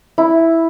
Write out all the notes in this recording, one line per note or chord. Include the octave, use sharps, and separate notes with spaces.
E4